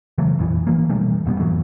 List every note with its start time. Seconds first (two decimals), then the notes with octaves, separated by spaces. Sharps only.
0.18 C#3 E3 F#3 A3
0.39 A#1 F2 E3
0.67 E3 F3 A#3
0.89 B2 E3 G3 A3
1.26 F1 B2 G3 B3
1.39 F2 G#2 E3 F#3